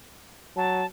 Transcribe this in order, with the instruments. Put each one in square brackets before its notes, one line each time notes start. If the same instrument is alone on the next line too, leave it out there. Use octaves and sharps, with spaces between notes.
[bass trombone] F#3 [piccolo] A5